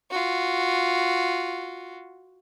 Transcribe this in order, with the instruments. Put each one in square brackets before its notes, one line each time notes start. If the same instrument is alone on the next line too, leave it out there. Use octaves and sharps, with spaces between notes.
[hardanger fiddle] F4 F#4